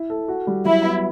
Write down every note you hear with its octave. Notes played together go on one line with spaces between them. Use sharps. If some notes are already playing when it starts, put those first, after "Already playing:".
Already playing: E4
A4
F#4
G3
F#3 E4
B3